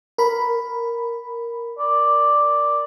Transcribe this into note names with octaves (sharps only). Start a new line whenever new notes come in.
A#4 B5
D5